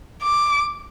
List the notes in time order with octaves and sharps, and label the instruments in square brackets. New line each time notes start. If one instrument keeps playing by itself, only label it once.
[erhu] D6